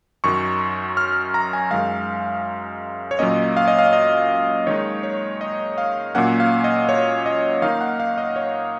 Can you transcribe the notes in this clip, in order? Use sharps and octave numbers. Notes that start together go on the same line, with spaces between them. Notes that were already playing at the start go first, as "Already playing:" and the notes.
F#2 D#3 F#3 C#6
F6
A#5
G#5
F#2 D#3 G#3 F5
C#5
A#2 F#3 A#3 C#4 D#5
F5
D#5
F5
D#5
D#3 G#3 D#4 C#5
C#5
D#5
F5
A#2 F#3 A#3 C#4 F#5
F5
D#5
C#5
D#5
D#3 A#3 D#4 F5
F#5
F5
D#5
C#5